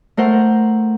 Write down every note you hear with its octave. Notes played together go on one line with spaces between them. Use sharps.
A3 A#4 C5 F#5